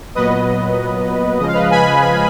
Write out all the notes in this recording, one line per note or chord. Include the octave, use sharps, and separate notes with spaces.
A#2 F#3 B3 B4 D#5
C#3 F3 G#3 D#5
F5
B4 D#5
G#5 B5